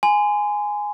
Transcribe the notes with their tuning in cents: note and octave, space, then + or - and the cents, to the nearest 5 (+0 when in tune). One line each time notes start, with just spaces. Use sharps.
G#5 +0 C6 -35